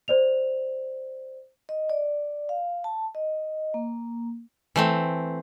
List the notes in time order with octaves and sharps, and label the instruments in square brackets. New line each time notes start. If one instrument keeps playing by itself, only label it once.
[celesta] C5 D5 F7
[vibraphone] D#5
D5
F5
A5
D#5
A#3
[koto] E3 A3 C4